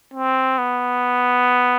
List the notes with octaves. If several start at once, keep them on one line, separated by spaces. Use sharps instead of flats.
C4
B3